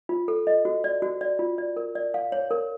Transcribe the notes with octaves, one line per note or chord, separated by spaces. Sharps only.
F4
A4
D#5
F#4
D5
F#4
D5
F4
D5
A#4
D5
F5
C#5
A#4